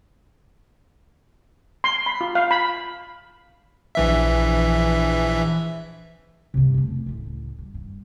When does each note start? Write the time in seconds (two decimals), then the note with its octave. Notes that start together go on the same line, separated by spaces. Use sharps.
1.84 C6
2.06 B5
2.21 F4
2.35 F5
2.51 B5
3.95 A#1 E3 E5
6.54 G2 C3
6.74 F2 A3
7.06 C#2 A2
7.59 G2
7.74 G2